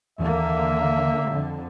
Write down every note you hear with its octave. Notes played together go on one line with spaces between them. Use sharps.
D#2 D3 E3 A#3 E5
F2 D3